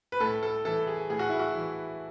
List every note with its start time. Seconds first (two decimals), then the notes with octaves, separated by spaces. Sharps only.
0.12 B4
0.20 A2 A4
0.43 A4
0.65 E3 A4
0.87 G#4
1.10 A2 G#4
1.19 F#4
1.29 E4
1.39 F#4
1.55 E3